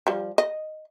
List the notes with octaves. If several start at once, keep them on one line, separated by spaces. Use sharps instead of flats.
F3 G3
D#5